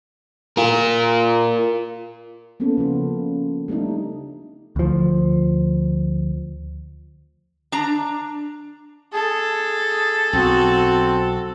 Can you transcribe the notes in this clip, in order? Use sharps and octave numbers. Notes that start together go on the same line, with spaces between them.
F4 A#4
A#3 B3 C#4 A4
C#3 F3 F4
G3 A3 C4 D4 D#4
D2 F3
D4 A#5
G#4 A4
B1 C4 F#4